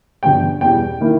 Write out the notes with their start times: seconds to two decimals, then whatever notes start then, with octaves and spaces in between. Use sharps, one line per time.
0.23 G1 G2 G3 G5
0.61 E2 B2 G3 G5
1.01 D#3 A#3 E4